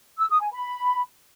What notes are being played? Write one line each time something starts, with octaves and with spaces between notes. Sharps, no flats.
E6
D#6
G#5
B5